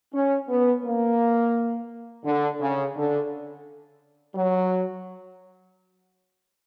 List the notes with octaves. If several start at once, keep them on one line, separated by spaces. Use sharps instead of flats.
C#4
B3
A#3
D3
C#3
D3
F#3